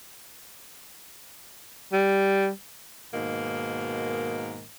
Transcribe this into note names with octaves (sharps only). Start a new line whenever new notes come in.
G3
G#2 B2 D#3 A#3